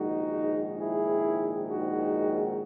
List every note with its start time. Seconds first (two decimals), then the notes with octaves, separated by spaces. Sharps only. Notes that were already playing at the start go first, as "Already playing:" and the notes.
Already playing: A#1 G#2 D#3 G#3 D#4 F#4
0.79 E4 G#4
1.69 D#4 F#4